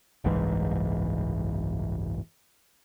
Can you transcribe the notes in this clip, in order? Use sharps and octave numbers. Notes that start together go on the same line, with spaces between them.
F#1 C2 G#2 E3